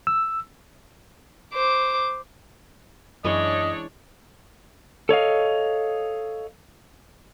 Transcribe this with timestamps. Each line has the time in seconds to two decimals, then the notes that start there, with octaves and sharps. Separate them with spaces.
0.07 E6
1.53 C5 D6
3.25 F#2 E3 G#3 C#4 D4 C#5 D#5
5.09 A4 C#5 D#5 F5